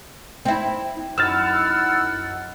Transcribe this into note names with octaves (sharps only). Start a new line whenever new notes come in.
C4 E4
F#2 D#4 E4 F#5 E6 F6 A6